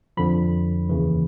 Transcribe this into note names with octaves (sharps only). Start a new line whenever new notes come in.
F2 D3 F3 B5
D#2 C#3 E3